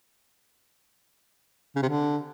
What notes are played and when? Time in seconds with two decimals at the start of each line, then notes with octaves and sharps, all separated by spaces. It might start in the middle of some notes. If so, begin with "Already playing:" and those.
1.76 C#3
1.82 C3
1.89 D3